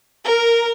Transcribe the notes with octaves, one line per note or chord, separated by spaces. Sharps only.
A#4